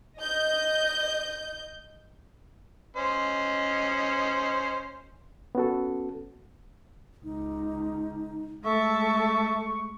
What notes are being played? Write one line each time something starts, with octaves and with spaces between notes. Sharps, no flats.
D#5 G6
C#4 C5 D#5
B3 C#4 F#4 A4
C#2 D#4
G#3 A3 A4 E5 A5 C#6